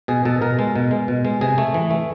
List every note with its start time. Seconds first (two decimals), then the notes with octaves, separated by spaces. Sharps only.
0.08 B2 G#4
0.25 B2 A4
0.42 B2 A#4
0.59 G#3
0.76 B2
0.91 G#3
1.08 B2
1.25 G#3
1.41 C3 G#4
1.58 A3
1.74 E3
1.91 A3